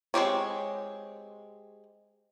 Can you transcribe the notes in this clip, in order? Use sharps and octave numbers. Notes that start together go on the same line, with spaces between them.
G#3 C4 G4 C#5